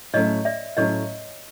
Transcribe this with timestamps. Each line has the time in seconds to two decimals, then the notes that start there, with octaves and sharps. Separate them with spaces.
0.13 A2 F#3 A3 C#4 C#5 D#5
0.45 D5 E5
0.77 A2 F#3 A3 C#4 C#5 D#5